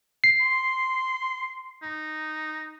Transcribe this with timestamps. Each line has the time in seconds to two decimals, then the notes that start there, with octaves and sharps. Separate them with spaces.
0.24 C7
0.41 C6
1.82 D#4